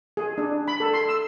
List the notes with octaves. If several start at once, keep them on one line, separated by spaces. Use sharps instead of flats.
G#4
D4
B5
A4
C6
E6